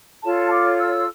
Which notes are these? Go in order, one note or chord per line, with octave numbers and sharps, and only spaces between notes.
F4 A4 C#5 A5
D6
E6